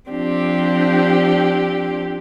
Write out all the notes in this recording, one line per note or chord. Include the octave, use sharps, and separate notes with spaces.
F3 C4 D4 G4